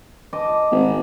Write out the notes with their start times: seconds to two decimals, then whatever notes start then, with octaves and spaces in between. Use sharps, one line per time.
0.33 D#5 A5 D6
0.71 G#1